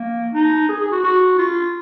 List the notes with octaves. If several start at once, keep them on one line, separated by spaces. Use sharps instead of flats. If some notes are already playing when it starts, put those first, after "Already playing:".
Already playing: A#3
D#4
G#4
G#4
F#4
F#4
F4